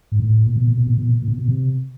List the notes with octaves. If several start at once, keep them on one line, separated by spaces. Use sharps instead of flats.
G#2
A2
A#2
B2
A#2
B2
A#2
B2
A#2
A#2
B2
B2
C3